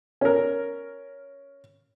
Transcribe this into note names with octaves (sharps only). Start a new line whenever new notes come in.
C#4 A#4